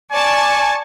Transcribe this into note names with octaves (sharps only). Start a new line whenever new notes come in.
D5 G#5 A5 C#6